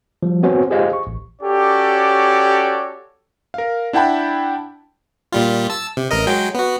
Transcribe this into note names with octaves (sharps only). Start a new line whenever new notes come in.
F3 G3
B3 C4 F#4 C5 C#5 G#5
F4 G4 G#4 C5 D#5 F5
C#6
A1
C#4 F#4 G4 A4 C#5 D5
A#4 F5
D4 E4 F#5 G5 A5 B5
A#2 G3 F4
A5 E6
C3
A1 A#4 D#5
F#3 G#3 G5
B3 F#4